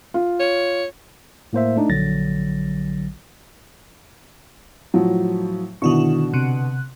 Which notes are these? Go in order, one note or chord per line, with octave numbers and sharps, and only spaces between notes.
F4
C#5
A2 A#3 C5 E5
A3 D4 D#4
A#1 D3 F#3 A6 A#6
A2 F3 F#3
B2 D3 D#3 E4 F#4 C#6
C3 F#6